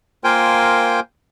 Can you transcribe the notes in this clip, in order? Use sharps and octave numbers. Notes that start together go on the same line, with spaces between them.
A#3 F4 A#4 C5 G5 G#5